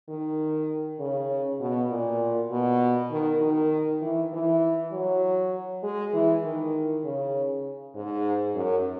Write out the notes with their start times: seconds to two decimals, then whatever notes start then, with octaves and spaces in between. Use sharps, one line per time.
0.09 D#3
1.00 C#3
1.60 B2
1.90 A#2
2.51 B2
3.11 D#3
3.42 D#3
4.02 E3
4.33 E3
4.92 F#3
5.83 G#3
6.14 E3
6.44 D#3
7.05 C#3
7.96 G#2
8.55 F#2